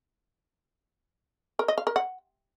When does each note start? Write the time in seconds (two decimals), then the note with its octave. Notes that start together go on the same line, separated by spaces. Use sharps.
1.59 A#4
1.68 D#5
1.78 F5
1.87 A#4
1.96 F#5